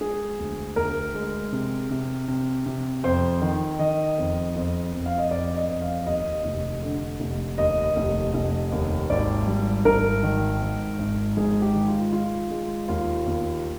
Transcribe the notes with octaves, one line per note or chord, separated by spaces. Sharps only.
G#3 G#4
D2
D2 A#4
G#3
C3
C3
C3
C3
F2 C5
D#3
D#3 D#5
F2
F2
F2
F5
D#5
F2 D5
D#5
F2
F5
D#2 D#5
F1
D3
F1
D#2 D#5
F1
F1
D#2
G#1 D5
G3
G#1 A#4
D#3
G#2
G#1
G#2 G#4
G4
D#3
F4
G#3 F4
G#3
D#2 F4
D#2